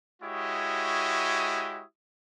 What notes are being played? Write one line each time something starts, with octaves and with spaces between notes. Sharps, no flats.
G#3 E4 F#4 G4 C#5 D#6